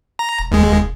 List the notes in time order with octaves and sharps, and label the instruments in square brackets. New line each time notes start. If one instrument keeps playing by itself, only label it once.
[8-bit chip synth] A#5
[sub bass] E1
[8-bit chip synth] D#2 G#3